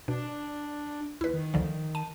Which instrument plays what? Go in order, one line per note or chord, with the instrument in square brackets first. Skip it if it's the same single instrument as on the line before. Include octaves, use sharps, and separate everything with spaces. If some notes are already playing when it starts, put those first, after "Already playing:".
[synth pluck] B2 [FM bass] D4
[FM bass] D#2 [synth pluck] E4 B4
[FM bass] D#3
[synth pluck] D2 D3 F3
A5 D#7